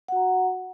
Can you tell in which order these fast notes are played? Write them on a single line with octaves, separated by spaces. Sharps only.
F#5 F#4 A#5